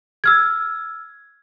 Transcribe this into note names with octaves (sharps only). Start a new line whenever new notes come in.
E6 F6 G#6